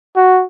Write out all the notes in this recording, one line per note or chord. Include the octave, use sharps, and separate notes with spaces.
F#4